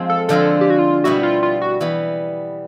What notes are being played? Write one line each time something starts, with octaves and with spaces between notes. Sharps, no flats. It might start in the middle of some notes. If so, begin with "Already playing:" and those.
Already playing: F3 G#3 C4
A4
D3 F3 G#3 C4 A4
G4
F#4
F4
B2 G3 B3 E4 F#4
F4
F4
F#4
E3 G3 B3